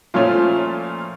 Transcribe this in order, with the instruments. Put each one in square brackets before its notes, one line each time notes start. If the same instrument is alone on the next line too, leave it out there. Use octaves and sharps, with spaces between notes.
[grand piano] A#2 F3 A3 C#4 F4